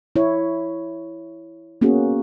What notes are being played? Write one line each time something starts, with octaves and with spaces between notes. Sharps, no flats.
E4 C#5
A#3 B3 C#4 F#4 G#4